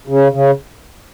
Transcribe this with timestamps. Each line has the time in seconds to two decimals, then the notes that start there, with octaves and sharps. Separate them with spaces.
0.08 C#3
0.32 C#3